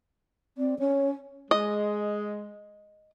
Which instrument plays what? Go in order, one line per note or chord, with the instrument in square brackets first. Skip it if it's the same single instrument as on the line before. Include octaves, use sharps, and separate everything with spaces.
[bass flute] C4 [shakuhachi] D5
[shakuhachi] C#4 [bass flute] C#5
[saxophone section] G#3 [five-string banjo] D#5